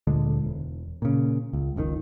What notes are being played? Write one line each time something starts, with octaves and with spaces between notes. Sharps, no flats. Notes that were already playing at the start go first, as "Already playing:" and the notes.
D2 A#2 D3 G#3
E1
A#2 C#3
C#2
F#1 C#2 B2 D#3